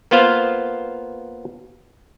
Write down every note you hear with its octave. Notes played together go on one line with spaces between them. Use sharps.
A#3 B3 F4 C5 F5